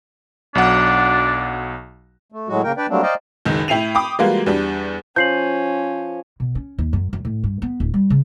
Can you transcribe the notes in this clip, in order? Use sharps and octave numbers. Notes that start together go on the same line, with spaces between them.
B1 F#3 D4 F#5
A3
A2 F#3 G#3 F#4
C#3 A#3 A#4 G5
D4 B4 D5 G5
F#3 G3 A3 A#3 C4 D4
C5 D5 D#5 F5 G5 A#5
F#1 C#2 D#3
A2 E4 G5 C7 D#7 F7
G5 B5 D6 D#6
E3 G3 G#3 A#3 F4 F#4
E2 G3 D4
F3 C#4 G6 C7 F#7
B2
C#4
D#2
F#2
F#2
A2
G2
B3
D1
G3
C#3